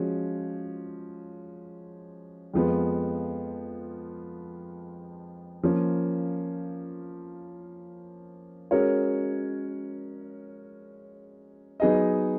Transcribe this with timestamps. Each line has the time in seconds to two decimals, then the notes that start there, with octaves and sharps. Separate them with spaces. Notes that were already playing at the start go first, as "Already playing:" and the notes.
Already playing: F3 G#3 C#4 F#4
2.54 F2 F3 G#3 B3
5.63 F3 A#3 C#4
8.71 G#3 C#4 F#4 A#4 C#5
11.80 F#3 B3 D#4 G#4 D#5